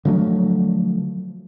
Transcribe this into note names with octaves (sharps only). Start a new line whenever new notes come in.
D3 F3 F#3 A3